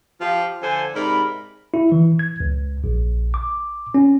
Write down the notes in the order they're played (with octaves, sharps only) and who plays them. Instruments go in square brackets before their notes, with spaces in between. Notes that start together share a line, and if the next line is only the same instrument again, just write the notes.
[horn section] F3 F4 G4
D3 F3 A4 C5 G#5
G#2 C3 A#4 D5 B5
[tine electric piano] E4
E3
G#6
C#2
A#1
D6
C#4